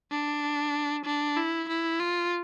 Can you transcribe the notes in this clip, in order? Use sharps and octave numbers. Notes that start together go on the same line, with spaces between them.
D4
D4
E4
E4
F4